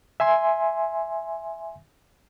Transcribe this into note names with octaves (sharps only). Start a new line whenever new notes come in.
E5 G#5 C6